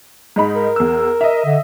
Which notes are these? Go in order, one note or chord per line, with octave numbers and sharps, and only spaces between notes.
G#2 D#4 B5
A#4
E2 E6
D#5 E5
D3